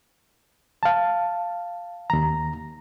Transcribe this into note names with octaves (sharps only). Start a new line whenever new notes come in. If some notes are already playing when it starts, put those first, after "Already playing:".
F5 A5
D#2 A#5